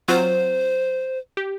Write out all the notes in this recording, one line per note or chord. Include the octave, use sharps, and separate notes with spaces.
F#3 C4 F4 C5
G4